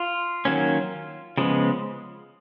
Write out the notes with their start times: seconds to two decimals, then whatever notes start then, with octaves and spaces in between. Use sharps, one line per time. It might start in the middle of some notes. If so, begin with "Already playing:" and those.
Already playing: F4
0.45 D#3 F#3 A#3 C#4
1.37 C#3 F3 G#3 B3